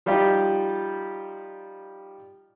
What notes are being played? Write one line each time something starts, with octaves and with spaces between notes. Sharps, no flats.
F3 G3 D#4 F4 G4